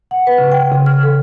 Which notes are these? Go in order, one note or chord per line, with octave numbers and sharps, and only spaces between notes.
F#5
B4
C#3
G5
C#3
F6
A4